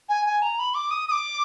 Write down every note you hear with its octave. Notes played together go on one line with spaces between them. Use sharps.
G#5
G#5
A#5
B5
D6
D#6
D#6
D6